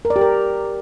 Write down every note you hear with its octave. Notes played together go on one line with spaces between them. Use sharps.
A#4
D5
G4
A#4